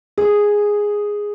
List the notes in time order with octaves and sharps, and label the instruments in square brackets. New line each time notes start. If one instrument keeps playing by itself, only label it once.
[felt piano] G#4